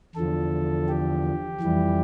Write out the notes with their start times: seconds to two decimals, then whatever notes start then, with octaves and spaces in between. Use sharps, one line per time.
0.15 E2 D3 F3 A4
0.88 G4
1.61 F2 E3 G3